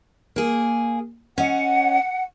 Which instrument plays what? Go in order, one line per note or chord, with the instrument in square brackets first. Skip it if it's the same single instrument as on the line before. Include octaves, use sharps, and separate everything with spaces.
[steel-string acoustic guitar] A#3 G#4
[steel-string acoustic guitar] C#4 D#5 [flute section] F#5